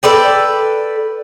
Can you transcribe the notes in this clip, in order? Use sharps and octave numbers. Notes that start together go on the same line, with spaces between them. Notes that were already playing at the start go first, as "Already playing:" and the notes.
A4 B4 D5 G5